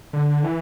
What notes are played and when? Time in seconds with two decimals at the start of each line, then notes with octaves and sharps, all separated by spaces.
0.13 D3
0.43 E3